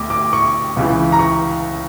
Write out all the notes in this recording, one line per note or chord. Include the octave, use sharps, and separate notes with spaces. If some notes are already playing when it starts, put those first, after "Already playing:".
Already playing: D2 D6
D6
C#6
C#2 C#3 E3
A#5
C#6